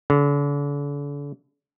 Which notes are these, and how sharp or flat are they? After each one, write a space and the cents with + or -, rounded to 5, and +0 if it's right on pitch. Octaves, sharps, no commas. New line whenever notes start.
D3 -40